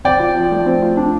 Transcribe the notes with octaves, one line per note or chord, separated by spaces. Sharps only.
C4 D5 G5
F4
F3
A3
C4
F4
D4